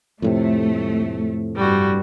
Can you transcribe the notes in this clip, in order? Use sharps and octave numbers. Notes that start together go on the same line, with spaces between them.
F2 A2 C3 A3
G2 G3 F#4